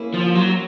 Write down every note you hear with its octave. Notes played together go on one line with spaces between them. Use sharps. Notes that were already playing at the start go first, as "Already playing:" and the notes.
Already playing: A#3 C#4 E4 G#4
F3
F#3